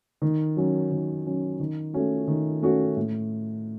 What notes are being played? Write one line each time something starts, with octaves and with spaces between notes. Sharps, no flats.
D#3
F#3 C#4
D#3
F#3 C#4
D#3
A3 C#4 F#4
D#3
A3 C#4 F#4
A2